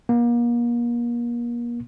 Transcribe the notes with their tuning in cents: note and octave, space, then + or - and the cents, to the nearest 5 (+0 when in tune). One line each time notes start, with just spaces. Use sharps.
A#3 +35